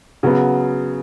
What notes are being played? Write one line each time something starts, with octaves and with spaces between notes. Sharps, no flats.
C#3 F#3 B3